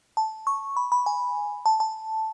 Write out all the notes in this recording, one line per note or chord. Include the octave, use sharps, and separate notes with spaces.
A5
C#6
B5
B5
G#5
A5
A5